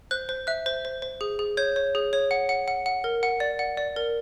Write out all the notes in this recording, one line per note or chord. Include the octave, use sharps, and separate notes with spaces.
C5 F#6
C5
E5 F#6
C5
C5
C5
G#4
G#4
C#5 G6
C#5
G#4
C#5
F#5
F#5
F#5
F#5
A#4
F#5
D5
F#5
D5
A#4